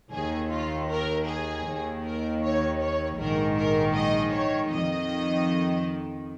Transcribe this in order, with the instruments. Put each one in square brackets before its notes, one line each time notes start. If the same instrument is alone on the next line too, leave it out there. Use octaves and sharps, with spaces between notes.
[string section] D#2 D#3 G#4
F4
A#4
G#4
D#2 D#3
A#4
C#5
C#5
A#1 G#2 D#3 A#4
A#4
D#5
C#5
F2 D#3 D#5